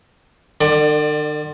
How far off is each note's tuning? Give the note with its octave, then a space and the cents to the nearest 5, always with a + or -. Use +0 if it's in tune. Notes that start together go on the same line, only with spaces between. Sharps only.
D3 +45 D5 +20